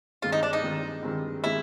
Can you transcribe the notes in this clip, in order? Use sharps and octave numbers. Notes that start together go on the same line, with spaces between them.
G2 D#3 G#3 C4 F4
D#4
D4
D#4
G2 D#3 G#3 C4
G2 D#3 G#3 C4
D#3 G#3 C4 E4